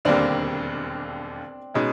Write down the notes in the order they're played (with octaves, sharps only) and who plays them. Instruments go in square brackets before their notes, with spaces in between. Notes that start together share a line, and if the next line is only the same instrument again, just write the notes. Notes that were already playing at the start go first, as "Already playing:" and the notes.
[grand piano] E1 D#2 D3 G3 A#3 [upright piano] C4 D4
[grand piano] B2 G#3 [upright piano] C#4 D#4